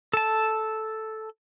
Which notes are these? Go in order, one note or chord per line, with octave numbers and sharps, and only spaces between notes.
A4 A5